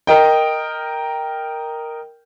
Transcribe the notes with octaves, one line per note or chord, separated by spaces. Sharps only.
A#4 D#5 G5